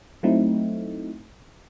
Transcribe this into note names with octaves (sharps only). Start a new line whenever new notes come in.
F#3 A3 C4 D#4 E4